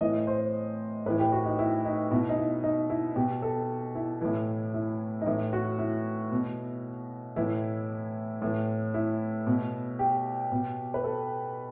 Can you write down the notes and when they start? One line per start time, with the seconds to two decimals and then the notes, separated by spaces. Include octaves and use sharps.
0.01 A2 E3 D#5
0.27 C5
1.06 A2 E3 B4
1.19 G4
1.33 F#4
1.46 D#4
1.59 E4
1.85 D#4
2.11 B2 E4
2.29 D#4
2.37 E4
2.64 D#4
2.90 E4
3.16 B2 G4
3.42 A4
3.95 E4
4.21 A2 E3
4.74 E4
5.21 D#4
5.26 A2 E3 E4
5.53 F#4
5.78 E4
6.32 B2
7.36 A2 E3 E4
8.42 A2 E3
8.94 E4
9.47 B2
9.99 G4
10.52 B2
10.94 B4
11.04 A4